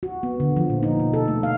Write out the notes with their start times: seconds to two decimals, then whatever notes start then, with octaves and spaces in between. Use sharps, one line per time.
0.03 F#4
0.23 B3
0.40 D3
0.56 F3
0.70 A#2
0.83 D#4
1.00 B2
1.14 A4
1.28 A3
1.43 F5